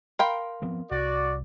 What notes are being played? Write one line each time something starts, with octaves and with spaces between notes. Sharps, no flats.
A#4 F5 G5 B5 C6
F3 B3 C4
C2 F#4 D5